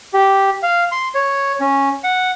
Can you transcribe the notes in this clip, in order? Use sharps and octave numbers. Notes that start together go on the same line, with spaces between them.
G4
F5
C6
C#5
C#4
F#5